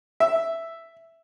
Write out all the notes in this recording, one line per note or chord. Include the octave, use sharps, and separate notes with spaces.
E5